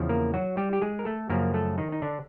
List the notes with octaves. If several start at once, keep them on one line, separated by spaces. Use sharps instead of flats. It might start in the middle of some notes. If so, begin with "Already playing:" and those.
Already playing: E2 C#3 F3
A#3 A#4
F#3 F#4
G3 G4
G4
G#3 G#4
A#4
A3 A4
F#2 C#3 F3 A#3 A#4
A3 A4
D#3 D#4
D#4
D3 D4